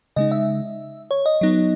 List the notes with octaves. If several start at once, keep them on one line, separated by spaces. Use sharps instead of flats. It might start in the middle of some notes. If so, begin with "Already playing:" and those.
C#3 G#3 D#4 D#5
E5
C#5
D#5
F#3 B3 D#4